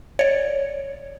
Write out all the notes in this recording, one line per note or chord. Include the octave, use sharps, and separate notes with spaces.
C#5 D5